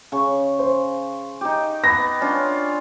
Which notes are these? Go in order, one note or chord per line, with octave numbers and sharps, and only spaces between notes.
C#3 C#6
C5
D#4 G4
B3 A#6
C#4 D4 F4